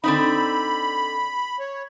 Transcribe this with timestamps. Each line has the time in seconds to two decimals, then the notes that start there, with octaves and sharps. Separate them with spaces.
0.04 D3 C4 D#4 B5
1.59 C#5